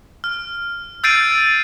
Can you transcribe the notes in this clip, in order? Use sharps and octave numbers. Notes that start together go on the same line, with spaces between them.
F6
E6 G6 A6 C7 D7 D#7